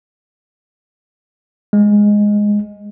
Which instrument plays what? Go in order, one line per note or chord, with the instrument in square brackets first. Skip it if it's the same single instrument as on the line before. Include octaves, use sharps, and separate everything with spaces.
[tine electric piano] G#3